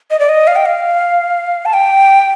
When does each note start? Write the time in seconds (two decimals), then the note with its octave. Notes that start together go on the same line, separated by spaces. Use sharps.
0.11 D#5
0.19 D5
0.29 D#5
0.47 F5
0.56 G5
0.66 F5
1.66 A5
1.74 G5